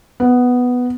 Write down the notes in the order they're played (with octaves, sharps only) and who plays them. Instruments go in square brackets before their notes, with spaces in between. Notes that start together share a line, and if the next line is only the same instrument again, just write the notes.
[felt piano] B3